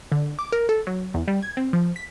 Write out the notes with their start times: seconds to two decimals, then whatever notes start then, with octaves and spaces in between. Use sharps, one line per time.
0.12 D3
0.39 D6
0.52 A#4
0.69 A4
0.87 F#3
1.14 E2
1.28 G3
1.42 G#6
1.57 C4
1.73 F3
1.96 B6